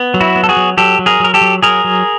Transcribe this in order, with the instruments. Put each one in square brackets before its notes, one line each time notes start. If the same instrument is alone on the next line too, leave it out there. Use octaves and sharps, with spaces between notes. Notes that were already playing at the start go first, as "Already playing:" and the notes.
Already playing: [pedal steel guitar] B3
F#3
E4 F#4
B3
A4
F#4 G#4
F#3
F#3 G4 A4
F#3
G#4 A#4
F#3 A#4
G4 A4
F#3
F#3 G#4 A#4
F#3